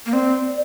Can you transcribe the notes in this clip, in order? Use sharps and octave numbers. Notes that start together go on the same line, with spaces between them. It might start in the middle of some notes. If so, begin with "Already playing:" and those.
A#3
C4 D5